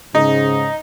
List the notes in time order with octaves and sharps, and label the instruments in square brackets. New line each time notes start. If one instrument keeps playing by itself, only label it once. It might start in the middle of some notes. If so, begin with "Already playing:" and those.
[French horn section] G#2 C#3 [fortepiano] D#4